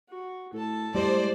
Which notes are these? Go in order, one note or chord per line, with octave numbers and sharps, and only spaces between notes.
F#4
A2 A4 A5
A2 G3 G#3 G4 C5 D5